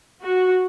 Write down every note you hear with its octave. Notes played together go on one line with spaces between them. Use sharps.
F#4